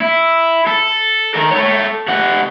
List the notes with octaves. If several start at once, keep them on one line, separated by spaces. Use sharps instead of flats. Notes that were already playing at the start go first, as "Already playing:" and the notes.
E4
A4
D#3 A#4
A4 C#5
C3 F#5